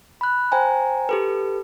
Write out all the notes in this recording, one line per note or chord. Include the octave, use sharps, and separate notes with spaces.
B5 F#6
C5 G5 G#5 A#5
G4 A4 B4